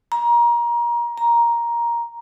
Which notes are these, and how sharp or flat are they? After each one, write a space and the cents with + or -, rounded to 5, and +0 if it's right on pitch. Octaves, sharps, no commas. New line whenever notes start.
A#5 +25
A#5 +10